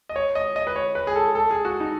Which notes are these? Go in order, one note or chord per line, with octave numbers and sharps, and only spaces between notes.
D#5
C#5
D#5
D#5
B4
C#5
B4
G#4
A4
A4
G#4
F#4
D#4